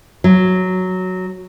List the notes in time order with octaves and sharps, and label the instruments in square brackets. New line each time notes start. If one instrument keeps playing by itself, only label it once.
[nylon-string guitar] F#3